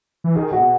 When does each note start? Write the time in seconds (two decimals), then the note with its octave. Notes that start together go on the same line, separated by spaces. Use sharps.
0.24 E3
0.35 D#3 G#4
0.52 A2 F#4
0.60 B2